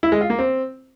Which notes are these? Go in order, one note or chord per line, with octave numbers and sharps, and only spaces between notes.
E4
G#3
F4
A#3
C4